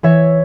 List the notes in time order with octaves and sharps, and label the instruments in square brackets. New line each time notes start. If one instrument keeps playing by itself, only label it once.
[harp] E3 C#5 E5